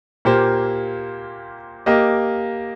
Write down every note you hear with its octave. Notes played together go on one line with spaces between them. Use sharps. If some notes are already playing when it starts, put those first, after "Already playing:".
A#2 A#3 G4 C5
A#3 G4 D#5